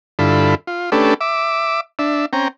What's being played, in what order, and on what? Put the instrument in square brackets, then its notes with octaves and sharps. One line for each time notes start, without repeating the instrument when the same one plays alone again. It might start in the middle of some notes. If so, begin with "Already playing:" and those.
[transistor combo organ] G2 D3 E4 F4 A4 B5
F4
A3 C#4 D4 G4 A4 B4
E5 D6
D4 E5
C4 C#4 G5 A#5